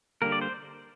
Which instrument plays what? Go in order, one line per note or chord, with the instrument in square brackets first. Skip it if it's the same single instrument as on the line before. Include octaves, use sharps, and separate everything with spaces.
[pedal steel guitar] D3 G3 A#3 A#4
D5
C5